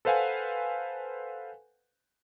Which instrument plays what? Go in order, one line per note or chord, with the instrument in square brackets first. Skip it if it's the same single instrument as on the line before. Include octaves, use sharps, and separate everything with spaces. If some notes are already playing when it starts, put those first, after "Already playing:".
[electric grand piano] A4 B4 C5 F5 F#5 G#5